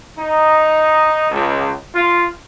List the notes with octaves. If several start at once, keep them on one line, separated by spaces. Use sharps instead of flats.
D#4
C#2
F4